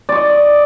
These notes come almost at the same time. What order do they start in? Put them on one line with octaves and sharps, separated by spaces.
D5 C#6 D#5